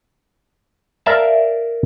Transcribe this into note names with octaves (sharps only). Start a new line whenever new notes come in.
A#4 D5 E5 F5 A5